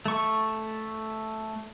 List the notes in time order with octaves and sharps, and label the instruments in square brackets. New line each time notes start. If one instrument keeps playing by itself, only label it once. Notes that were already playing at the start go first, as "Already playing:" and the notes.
[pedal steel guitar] A3 C#6